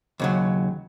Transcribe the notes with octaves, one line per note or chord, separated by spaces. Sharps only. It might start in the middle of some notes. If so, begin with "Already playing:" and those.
D#2 C#3 F#3